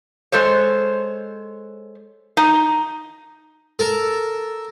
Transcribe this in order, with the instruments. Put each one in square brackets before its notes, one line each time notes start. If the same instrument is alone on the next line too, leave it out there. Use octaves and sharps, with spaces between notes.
[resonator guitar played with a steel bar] G#3 A4 C5 C#5
D#4
[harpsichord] A4 A#4